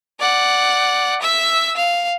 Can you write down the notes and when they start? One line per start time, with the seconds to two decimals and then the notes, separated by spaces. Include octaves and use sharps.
0.19 D5 F#5
1.21 E5 E6
1.76 F5